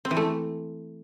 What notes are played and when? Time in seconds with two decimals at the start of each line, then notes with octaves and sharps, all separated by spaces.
0.05 C4
0.11 E3
0.17 A3